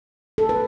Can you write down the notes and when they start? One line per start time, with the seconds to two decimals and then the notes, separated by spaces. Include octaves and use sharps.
0.38 A4
0.49 B4